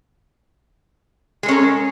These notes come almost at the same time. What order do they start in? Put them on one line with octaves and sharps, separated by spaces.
G#3 A4 C#4 A#4